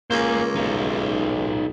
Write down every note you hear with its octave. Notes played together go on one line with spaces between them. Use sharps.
C#2 A#3 C5 G#5
B1 D#4 F4